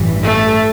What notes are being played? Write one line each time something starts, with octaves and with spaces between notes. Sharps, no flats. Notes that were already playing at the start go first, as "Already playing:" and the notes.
Already playing: A1 G2 E3
A3